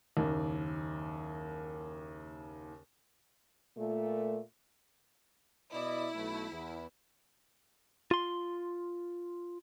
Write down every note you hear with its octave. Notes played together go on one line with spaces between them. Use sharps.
F#1 D#2
A#2 A3
B2 E4 D5 D#5
B1 A3
E2
F4 C6